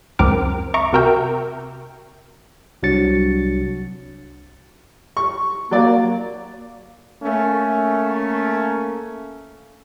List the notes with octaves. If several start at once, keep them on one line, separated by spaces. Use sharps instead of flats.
C#2 F#2 C4 A#4 D6 F6
E5 A#5 C#6 D6
C3 F#4 A#4 E5 G5
C2 F#3 D4 F#4 A6 C#7
C#6
F#3 A#3 D5
A3 A#3 C#4